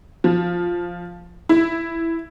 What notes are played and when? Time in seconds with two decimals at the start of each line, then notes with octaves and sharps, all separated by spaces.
0.24 F3
1.49 E4